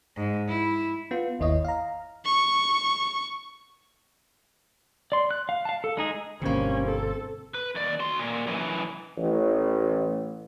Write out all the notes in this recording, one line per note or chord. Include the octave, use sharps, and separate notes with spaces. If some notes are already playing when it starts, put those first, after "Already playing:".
G#2
E4
B3 F4
G1 D#2 E4 C#5 D#5
F5 A#5
C#6
D5 C6
F#6
F5
F5 A5
A4
G#3 D#4 G#4
G1 G2 B2 D3 A#3 C4 C#4
A4
B4
D#2 D5
F#4 C6
A#2
F#2 E3
A1